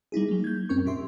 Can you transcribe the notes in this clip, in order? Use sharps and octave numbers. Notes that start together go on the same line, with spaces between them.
G3 D#4 E4 G#4
F#3 A#3
G6 G#6
F#2 C4 C#4 A#4 C#6
A#2 G4 E5 C6